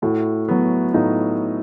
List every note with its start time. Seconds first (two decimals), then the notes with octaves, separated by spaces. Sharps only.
0.02 A2 E4 F#4
0.48 F#3 B3
0.93 A2 D#4 F4